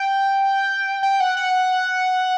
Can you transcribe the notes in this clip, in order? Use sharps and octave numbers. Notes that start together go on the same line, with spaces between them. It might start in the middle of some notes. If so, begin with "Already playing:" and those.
Already playing: G5
G5
F#5
F#5